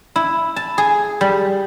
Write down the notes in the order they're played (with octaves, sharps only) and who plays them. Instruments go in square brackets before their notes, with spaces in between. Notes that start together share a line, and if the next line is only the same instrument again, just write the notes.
[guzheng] E4
A5
G#4
G3